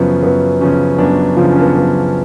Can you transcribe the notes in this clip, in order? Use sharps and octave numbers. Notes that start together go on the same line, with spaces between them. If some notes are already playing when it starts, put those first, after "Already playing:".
Already playing: F#2 C#3 F3 B3 C#4
F#2 B3
C#3 F3 C#4
F#2 B3 D4
C#3 F3 F4
D4
C#4
B3 D4
F#2 B3